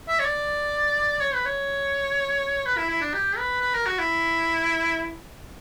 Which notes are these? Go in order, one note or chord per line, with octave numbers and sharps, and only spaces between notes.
E5
C#5
D5
C#5
B4
C#5
B4
E4
E4
D4
G4
B4
B4
A#4
F#4
E4